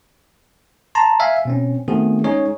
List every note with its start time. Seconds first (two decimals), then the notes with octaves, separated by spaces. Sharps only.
0.95 A5 A#5 C6
1.20 E5 F5 G#5
1.45 B2 C4 C#4
1.88 D#3 A3 B3 C4 F#4 G#4
2.24 G#3 C#4 D#4 G#4 C#5